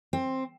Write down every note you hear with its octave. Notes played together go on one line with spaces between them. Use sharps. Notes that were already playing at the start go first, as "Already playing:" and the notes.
C4